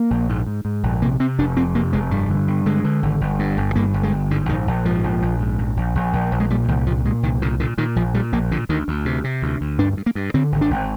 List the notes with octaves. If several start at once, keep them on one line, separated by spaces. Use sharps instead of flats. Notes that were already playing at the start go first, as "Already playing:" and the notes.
Already playing: A#3
A#1
G#2
G#2
G#2
A#1
C3 A#3
C3 C4
F1 D4
F2 C4
C3 A#3
F1 G#3
G2 G3
D3
G2
D3 G#3
D3
G#1
G1
G2
G1
G2 A#3
G1
G#3
G1
G#2 D3
A#1 D#3
A#1
G#2 F3
A#1
A#1
G#2
A#1
A#1
A#1
A#1
A#1
G#3
A#2 G3
C2 D#3
A#2 F3
A#2 G#3
C2 D#3
A#2 D3
A#2 D3
A#2 D#3
A#1 F3
A#2 G3
A#1 A#3
A#2 D3
D2 D#3
D2
C3
C3
D2
D2
G2 D4
G2
A#3
G2
D3 C4
G#1
D4
G#1